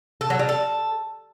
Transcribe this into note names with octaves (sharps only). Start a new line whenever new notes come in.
A4
F#3
G3
A4